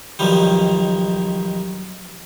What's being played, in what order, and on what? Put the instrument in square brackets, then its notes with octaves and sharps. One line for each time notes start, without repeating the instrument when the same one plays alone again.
[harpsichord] B1 D#3 F3 G3